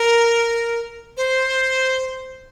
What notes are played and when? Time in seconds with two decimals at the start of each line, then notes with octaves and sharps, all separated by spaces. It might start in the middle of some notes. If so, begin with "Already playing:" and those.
Already playing: A#4
1.17 C5